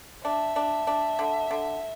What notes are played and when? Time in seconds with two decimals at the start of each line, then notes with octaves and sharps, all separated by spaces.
0.24 D4 E5
0.56 D4
0.87 D4
1.19 D3
1.51 D3